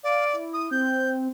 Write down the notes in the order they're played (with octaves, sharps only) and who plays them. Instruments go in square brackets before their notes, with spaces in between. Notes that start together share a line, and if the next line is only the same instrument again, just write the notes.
[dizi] D5 [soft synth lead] F5
[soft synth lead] E4
[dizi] D#6
[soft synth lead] C4 [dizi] G6